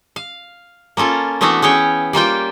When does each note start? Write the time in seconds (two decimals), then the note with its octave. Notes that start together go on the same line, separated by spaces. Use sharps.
0.16 F5
0.97 A#3 C#4 F4 A4
1.41 E3 A3 B3 D4 E4 F#4
1.62 C#4 G#4 C#5 G5
2.13 G3 A#3 F4 G5